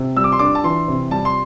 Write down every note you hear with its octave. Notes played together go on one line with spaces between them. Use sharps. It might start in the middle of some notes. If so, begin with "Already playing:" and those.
Already playing: C3
G3 E6
D6
C6
D4 D6
A5
E3 C6
C3
G3 A5
C6